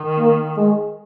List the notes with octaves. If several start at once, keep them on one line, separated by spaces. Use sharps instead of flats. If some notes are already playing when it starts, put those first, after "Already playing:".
Already playing: D#3
A#3
G#3